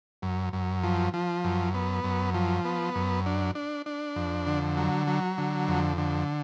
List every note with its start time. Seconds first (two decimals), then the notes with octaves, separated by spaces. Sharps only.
0.22 F#2
0.53 F#2
0.83 F3
1.14 F3
1.44 F#2
1.74 B3
2.04 F#2
2.34 F3
2.65 B3
2.95 F#2
3.26 D4
3.55 D4
3.86 D4
4.16 F2
4.47 D3
4.77 F#3
5.07 F#3
5.38 D3
5.68 F2
5.97 D3